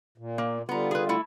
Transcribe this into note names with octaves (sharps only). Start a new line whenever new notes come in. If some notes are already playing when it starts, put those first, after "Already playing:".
A#2
A#3
D3 G3 B3 F4 A#5
G#4 B4
A3 E4